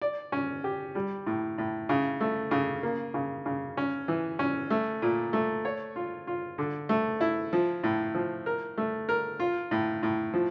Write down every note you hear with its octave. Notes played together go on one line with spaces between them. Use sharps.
D5
C#4
G4
G3
A2
A2
C#3
A3
C#3
A#3
C#3
C#3
C#4
E3
C#4
A3
A#2
A3
C#5
F4
F4
D3
A3
E4
F3
A2
F3
A#4
A3
A#4
F4
A2
A2
F3